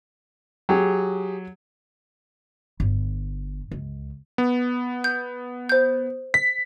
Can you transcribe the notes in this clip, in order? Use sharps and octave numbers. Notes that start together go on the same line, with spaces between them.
F#3 G4 G#4
G1
C#2
B3
G6
C5 G6
B6